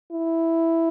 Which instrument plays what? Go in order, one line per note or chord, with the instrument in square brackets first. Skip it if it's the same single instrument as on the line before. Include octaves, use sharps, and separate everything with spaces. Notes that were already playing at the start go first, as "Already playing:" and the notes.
[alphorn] E4